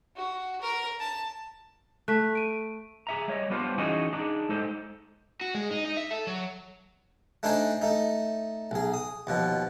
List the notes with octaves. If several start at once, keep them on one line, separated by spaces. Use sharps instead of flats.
F#4
A#4
A5
A3 F#6 B6
D7 D#7
G#4 E5 A#5
G3 C#5 D#5
G3 B3 D4 F4 C5
E3 C#4 D#4 F#4 G#4 D#5
D4 D#4 G#4
G#3 D#4 A4 C5
F#4
G#3
D#4
D#4
E5
A4
F#3
A3 D4 D#4 C5 G#5
A3 D#4
B1 G#4
D#6
D#2 B2 F3